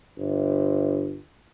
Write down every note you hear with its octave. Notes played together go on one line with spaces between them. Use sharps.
G1